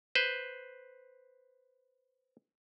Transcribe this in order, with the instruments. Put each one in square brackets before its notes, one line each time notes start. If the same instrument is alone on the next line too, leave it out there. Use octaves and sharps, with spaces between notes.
[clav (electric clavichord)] B4 C5